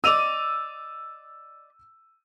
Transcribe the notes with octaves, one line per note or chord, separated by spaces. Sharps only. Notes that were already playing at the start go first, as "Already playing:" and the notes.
D5 D#5 E6 D#7 F7